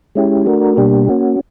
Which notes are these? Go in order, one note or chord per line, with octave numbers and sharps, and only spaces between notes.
G#3 C#4 E4 G4
A3 D4 F#4 A#4
B2 G3 A#3 D4 G4
A#3 C#4 F#4